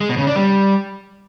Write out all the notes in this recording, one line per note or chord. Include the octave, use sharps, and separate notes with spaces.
G#3
B2
C#3
D4
G3